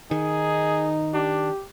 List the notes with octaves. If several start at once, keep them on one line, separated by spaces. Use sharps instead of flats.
D#3 D#4 G#4
D4 G4